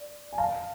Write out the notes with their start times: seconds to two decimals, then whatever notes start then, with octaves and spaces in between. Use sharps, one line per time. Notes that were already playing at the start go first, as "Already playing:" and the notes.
Already playing: D5
0.33 G#5
0.38 F5 A5